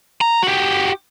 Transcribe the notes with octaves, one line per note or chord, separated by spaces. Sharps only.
A#5
F#4 G4